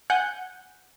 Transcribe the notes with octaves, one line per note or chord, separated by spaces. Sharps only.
F#5 G#5 F#6 G6